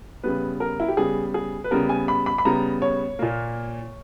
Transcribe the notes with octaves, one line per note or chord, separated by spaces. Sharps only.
C#3 G3 B3 B4
A#4
E4
G4
C#3 G3 B3 G#4
G#4
B4
C#3 G3 B3 A#4
G#5
B5
B5
B5
C#3 G3 B3 A#5
C#5
A#2 A#3